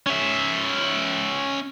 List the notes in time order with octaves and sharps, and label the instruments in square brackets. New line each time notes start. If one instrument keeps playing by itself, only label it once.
[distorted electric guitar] C#4 E5